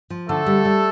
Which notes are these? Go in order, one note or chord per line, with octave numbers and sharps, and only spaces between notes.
F3
D3 A3 A4
G3
G3